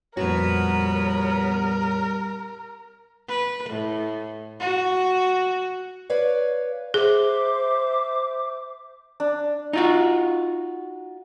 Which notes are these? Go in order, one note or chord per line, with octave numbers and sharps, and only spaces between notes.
F2 A#2 G3 B3 F#4 A#4 C#5
B4
A2
F#4
B4 C#5 D5 F5
G#4 C5 E5 D6
D4
D#4 F4 F#4